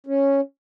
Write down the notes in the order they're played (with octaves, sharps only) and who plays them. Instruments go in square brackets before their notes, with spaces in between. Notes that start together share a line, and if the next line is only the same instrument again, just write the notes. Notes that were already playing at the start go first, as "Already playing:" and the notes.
[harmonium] C#4